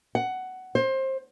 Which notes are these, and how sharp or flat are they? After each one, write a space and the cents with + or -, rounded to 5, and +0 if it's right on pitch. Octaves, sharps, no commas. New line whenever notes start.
F#5 +10
C5 +25